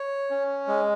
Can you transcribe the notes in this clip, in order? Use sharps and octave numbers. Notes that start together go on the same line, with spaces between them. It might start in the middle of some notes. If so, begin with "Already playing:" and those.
Already playing: C#5
C#4
G#3